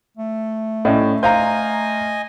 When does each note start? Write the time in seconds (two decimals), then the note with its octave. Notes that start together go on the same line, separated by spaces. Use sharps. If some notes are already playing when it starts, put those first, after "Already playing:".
0.17 A3
0.85 A2 C#4 D5 D#5
1.23 C5 D#5 F5 G#5 A#5 G6